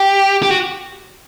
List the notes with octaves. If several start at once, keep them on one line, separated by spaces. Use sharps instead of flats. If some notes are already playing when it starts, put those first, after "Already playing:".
Already playing: G4
G4
F#4